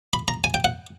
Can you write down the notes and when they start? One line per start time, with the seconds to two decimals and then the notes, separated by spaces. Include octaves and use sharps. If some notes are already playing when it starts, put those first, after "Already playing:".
0.13 B5
0.28 A#5
0.44 G#5
0.54 G5
0.64 F#5